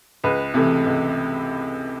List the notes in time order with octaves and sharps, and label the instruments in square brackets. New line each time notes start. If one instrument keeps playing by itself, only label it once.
[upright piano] C#2 B4
C3 E3 A3
C#2